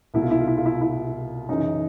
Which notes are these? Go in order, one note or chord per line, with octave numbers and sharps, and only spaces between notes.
C2 B2 E4
F4
E4
F4
E4
F4
E4
E4
F#2 C#3 E3 D#4